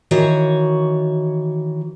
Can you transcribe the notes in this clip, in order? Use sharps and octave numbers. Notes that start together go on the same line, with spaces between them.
D#3 E3 F#4 C#5